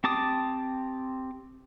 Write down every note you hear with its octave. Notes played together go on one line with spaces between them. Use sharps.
C4 G4 A5 D6 D#6